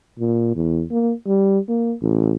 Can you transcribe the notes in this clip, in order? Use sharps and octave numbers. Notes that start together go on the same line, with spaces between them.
A#2
E2
A#3
G3
A#3
A1